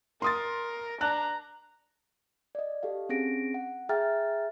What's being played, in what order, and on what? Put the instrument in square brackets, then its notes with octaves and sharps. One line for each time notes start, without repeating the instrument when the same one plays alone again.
[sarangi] A#4 [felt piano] C6 D#6 A6
[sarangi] D4 [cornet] A#5 [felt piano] F#6
[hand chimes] D5 D#5
G4 A4 F5
C4 C#4 G#4 A#6 D7
F#5
G#4 E5 G5 A#5 F6 A6